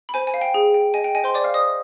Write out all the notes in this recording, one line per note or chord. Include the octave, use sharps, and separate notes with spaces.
B5
C5 G#5
G#5
F5
G5
G#4
G5
D#5 G#5
G5
D#5 G#5
C5 C6
C5 D5 D6
F5 F6
C5 D#5 D#6